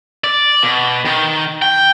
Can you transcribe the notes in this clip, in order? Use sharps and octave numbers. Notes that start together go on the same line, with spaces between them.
D5
B2
D#3
G5